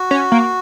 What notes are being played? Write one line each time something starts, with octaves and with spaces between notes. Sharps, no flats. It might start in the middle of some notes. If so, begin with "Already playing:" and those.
Already playing: F#4
C#4
A#3